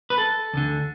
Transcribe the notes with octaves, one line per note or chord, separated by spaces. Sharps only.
B4
A4
D2 D3